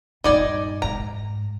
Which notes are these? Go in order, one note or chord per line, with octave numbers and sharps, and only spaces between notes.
G2 A#2 D#4 D5 G#5
F2 G#2 A#5